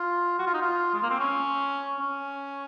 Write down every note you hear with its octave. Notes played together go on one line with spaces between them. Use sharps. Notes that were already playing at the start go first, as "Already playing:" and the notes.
Already playing: F4
F#4
F4
D#4
F4
G#3
A#3
C4
C#4
C#4